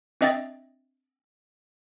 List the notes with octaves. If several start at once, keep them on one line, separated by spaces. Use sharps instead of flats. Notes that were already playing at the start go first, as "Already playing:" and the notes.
C4 D4 D#5 E5 G5 A6